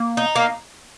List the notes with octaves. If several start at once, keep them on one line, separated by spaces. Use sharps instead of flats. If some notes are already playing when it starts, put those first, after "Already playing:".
Already playing: A#3
D#4
A#3